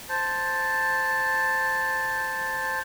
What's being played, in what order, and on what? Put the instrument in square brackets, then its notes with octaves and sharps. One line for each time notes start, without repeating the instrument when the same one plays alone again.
[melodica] C5 A5